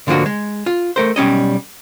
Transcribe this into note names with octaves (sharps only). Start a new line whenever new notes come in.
G#2 D3 F3 A#3 D4 F#4
G#3
F4
A3 A#4 C5
B1 G3 C#4 D#5